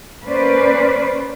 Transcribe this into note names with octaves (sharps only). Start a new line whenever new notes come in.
A#3 C#4 B4 C5 D5